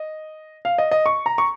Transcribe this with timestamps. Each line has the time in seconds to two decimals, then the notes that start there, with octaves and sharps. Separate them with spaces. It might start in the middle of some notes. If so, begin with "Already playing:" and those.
Already playing: D#5
0.65 F5
0.78 D#5
0.91 D#5
1.06 C#6
1.26 A#5
1.38 C#6